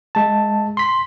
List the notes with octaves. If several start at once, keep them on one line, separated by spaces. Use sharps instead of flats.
G#3 A5
C6 B6